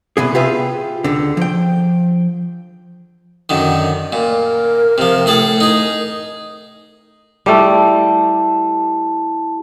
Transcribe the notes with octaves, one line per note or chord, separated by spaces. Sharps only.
C3 B3 G#4
F4 G4 G#4 B4 E5
C#2 D3
F3 G5
F#2 D3 D#3
A#2 A#4
C3 F3
A2 G#4 A4
D#4 G#4
G3 A3 E4 G4 A5